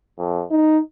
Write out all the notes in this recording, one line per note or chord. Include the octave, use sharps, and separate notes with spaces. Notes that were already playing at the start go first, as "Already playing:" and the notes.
F2
D#4